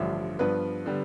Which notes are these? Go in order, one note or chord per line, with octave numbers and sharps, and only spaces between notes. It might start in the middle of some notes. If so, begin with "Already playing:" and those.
Already playing: A1 G2 D3 F3 E5
G2 F3 B3 D4 B4
D3 G3 B3